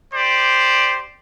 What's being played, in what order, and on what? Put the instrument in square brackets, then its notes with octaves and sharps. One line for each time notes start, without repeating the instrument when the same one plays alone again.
[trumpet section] G4 C5 D5